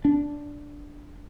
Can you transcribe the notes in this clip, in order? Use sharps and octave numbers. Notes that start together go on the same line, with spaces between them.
D4